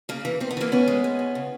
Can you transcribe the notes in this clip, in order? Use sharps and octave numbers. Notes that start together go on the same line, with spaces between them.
C#3 A#3
E3
E3 C4
B3
E3 A#3 C4
D#2 B3 C#4
G#3
G#3
D#2
C#3